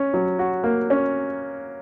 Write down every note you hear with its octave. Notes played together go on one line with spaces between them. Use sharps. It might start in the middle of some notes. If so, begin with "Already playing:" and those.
Already playing: C#4
F#3
F#4
A#3
C#4